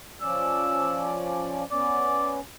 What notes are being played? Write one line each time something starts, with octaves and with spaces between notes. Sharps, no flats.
F3 C#4 D5 E6
B3 C#4 D5